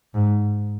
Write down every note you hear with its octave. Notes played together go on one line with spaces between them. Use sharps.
G#2